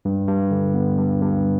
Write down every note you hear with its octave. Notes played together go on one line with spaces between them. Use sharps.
G2
G2
D3
B3
G2
G2